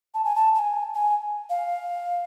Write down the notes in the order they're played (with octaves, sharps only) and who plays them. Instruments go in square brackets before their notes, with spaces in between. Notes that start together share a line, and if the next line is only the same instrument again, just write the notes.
[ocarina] A5
G#5
A5
A5
G#5
G#5
F5